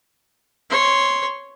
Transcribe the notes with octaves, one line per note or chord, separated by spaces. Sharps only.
C#5 C6